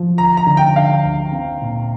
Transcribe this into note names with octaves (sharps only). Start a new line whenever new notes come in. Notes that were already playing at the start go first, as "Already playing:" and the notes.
Already playing: F3
D2 A#5
A#5
D3
G5
D3 F5
D2
C4
A#2